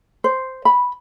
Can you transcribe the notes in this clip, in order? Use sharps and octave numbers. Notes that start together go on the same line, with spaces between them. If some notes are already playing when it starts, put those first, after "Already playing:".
C5
B5